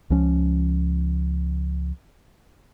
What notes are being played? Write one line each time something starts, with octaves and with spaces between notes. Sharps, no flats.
C#2 F3 C#4